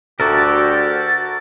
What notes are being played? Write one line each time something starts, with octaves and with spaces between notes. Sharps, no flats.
D2 F#4 G4 A4 A#4 A6